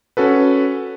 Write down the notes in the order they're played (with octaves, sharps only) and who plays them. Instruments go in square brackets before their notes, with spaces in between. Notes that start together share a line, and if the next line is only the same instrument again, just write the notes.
[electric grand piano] C#4 F#4 A4 B4